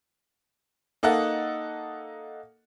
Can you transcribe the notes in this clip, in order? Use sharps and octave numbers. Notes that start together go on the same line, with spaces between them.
A#3 D#4 A4 D#5 F#5